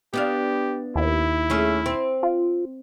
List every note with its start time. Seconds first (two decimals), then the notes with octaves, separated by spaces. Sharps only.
0.14 B3 D4 G4 F5
0.96 D#2 E4
1.50 A3 C#4 G#4
1.86 C4
2.23 F4